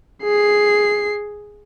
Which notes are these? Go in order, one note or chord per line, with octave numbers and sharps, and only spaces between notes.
G#4 C7